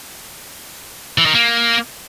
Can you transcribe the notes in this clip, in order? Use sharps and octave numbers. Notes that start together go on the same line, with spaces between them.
E3
D#3
A#3